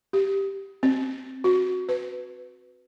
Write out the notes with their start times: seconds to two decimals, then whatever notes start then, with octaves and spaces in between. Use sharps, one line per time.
0.13 G4
0.83 C4
1.44 F#4
1.89 B4